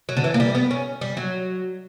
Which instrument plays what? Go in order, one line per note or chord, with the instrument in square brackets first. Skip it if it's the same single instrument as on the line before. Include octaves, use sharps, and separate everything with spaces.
[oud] F#3
D3
E3
A#3
G3
B3
C#4
G3
F#3